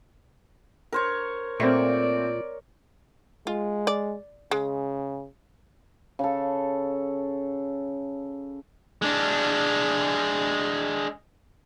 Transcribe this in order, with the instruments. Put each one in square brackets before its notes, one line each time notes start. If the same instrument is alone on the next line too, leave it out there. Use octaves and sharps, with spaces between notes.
[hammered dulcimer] A#4 C5 C#5
[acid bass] A#2 [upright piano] A3 C4 [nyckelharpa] D5 [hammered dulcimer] C#6
[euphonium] G#3 [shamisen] F4
[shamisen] D5
[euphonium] C#3 [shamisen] G#3
[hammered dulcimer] C#3 A4
[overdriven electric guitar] G#3 D4